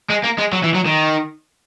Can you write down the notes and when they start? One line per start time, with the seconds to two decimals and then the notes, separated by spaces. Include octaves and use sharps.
0.10 G#3
0.24 A#3
0.38 G#3
0.53 F#3
0.64 E3
0.74 F#3
0.86 D#3